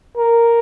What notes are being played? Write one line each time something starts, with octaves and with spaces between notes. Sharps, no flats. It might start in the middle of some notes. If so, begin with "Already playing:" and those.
A#4